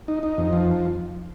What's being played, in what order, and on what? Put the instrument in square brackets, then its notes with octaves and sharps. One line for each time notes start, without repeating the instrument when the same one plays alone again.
[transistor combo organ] D#4
D#4
F2
F3